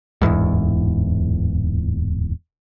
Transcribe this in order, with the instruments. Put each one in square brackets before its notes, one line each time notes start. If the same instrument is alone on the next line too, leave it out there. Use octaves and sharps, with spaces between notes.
[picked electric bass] D1 G#1 E2 G#2